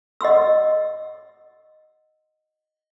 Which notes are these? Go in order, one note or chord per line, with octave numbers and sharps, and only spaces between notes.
D#5 F#5 C6 E6